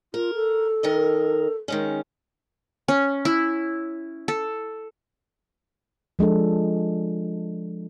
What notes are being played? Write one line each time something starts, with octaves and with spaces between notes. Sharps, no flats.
F4 A#4
A4
D#3 A#4 D#5
D#3 G#3 C#4
C#4
E4
A4
F3 G#3 D4 A4